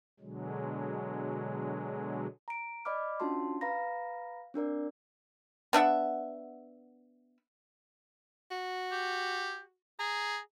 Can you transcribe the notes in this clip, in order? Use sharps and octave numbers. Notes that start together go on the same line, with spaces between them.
B2 D3 F#3 G#3
A#5 D7
D5 D#5 B5 D6 F6
C#4 D4 F4 F#4 A5 C6
B4 F5 A#5 B5 A#6
C4 D4 A#4 D5
B3 D4 E5 F#5
F#4
G4
G#4 A#5